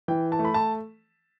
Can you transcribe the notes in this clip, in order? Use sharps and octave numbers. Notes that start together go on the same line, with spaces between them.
E3 G5
A5
A3
B5
A5